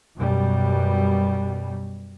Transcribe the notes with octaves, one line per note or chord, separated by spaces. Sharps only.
F#2 B2 G3